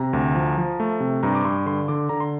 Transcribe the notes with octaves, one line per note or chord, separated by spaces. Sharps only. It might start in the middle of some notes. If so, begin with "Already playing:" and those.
Already playing: C3 A#5
D2
F3
F3
A3
C3
G2 A#5
D6
G2 C6
D3 C6
D3 D6
D3 A#5
C6